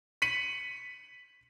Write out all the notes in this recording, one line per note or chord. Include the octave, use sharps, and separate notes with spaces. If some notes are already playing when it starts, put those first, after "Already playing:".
B6 C#7 D#7 F#7